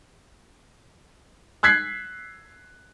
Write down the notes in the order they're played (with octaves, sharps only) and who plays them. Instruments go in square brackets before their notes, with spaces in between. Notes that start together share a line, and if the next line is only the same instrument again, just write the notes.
[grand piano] E6 F#6 G#6 B6 C7